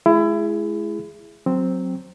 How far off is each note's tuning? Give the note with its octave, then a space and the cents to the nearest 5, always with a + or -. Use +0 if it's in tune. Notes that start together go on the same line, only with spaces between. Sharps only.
G#3 +35 E4 +25 G#4 +0
F#3 +0 C4 +0